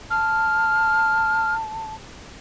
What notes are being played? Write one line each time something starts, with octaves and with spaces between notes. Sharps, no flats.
A5 F6